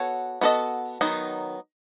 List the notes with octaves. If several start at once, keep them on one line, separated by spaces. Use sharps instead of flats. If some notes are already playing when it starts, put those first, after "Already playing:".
Already playing: B3 F#4 A4 C#5
B3 F#4 A4 D#5
D#3 F#3 B3 D#4